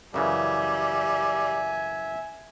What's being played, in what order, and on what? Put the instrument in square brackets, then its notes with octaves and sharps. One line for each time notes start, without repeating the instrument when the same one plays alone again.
[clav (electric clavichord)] F#2 C#3 E3 [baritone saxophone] G3 [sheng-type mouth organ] E5 [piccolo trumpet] G#5